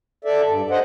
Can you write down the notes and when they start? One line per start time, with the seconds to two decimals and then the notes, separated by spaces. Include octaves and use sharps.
0.25 A4 D5 E5
0.47 G2
0.71 C5 D#5 F#5